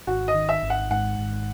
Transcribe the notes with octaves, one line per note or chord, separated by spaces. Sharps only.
G#1 F#4
D#5
D#3
E5
G#1
F#5
G#2 F#5
G#1